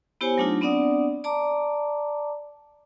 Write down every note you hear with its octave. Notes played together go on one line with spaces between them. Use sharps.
B3 E4 G4 C5 C#5 G#5
F#3 A3 D4 D#4 F4
B3 C4 D4 D5 F#5 D#6
D5 A5 A#5 D6